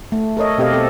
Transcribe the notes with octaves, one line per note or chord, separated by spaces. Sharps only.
A3
A4 A#4 C#5 D#5
B2 C4 G4 A4 D#5 F5
C4 A4